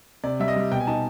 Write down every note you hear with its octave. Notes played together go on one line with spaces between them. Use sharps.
C3 D5
G3 E5
D#5
G3
B2 G5
G#5
D#4 A5